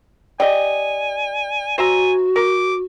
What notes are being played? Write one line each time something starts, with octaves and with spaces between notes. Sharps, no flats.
G4 D5 D#5 G#5
F#4 C5 E5 G#5 A#5
A#4 D6